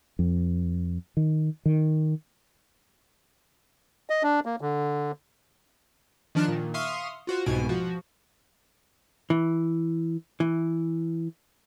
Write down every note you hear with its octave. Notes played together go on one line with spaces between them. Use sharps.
F2
D#3
D#3
D#5
D4
A#3
D3
D#3 F3 D4 F6 F#6 E7
A#2 D#3
E5 F5 C6 C#6 D#6 F6
F4 F#4 C5
C2 G#2 B2 G#5 D7
F3 F#4
E3
E3